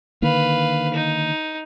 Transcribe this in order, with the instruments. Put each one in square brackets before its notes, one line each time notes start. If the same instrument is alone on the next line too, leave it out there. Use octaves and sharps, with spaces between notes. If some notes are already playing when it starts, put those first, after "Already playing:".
[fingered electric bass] D3 D#3 A#3 [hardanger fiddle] B4 F5
[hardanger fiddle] D#4